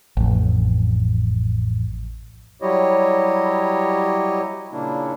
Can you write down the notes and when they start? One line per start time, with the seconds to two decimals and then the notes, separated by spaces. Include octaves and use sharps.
0.17 A1 F2
2.62 F#3 G3 E4 G4 C#5 D#5
4.72 A#2 C#3 A#3 D4 E4